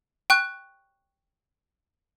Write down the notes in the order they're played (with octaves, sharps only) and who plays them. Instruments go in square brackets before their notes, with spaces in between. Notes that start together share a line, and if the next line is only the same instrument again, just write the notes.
[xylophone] G5 C#6 F#6